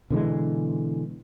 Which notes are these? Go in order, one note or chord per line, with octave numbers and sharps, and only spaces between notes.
B2 D3 E3 G#3